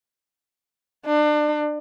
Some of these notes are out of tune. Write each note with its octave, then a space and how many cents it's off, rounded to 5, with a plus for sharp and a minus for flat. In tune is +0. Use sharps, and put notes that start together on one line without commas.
D4 +30